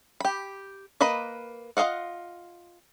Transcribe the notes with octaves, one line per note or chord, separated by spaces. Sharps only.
G4 B5
A#3 B4 D#5 B5
F4 A#4 D#5 F5 F#5